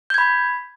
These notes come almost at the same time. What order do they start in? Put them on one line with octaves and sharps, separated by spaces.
G6 G#6 B5